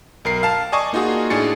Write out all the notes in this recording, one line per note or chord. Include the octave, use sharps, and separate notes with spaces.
B1 A#4 C7
F5 A5
D5 D#5 G#5 A5 C#6 D#6
A#3 D#4 F4 F#4 G#4
A2 D4 G#4 A6 C#7